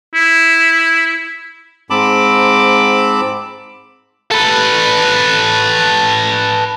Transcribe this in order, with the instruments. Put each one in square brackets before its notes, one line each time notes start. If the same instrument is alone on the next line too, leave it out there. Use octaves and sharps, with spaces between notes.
[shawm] E4
[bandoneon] G#2 C4 A5 B5 D6
[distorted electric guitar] A4 B4